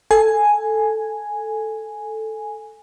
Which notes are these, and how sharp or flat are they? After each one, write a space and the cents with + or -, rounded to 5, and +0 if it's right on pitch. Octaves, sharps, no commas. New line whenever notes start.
A4 +0 G#5 +0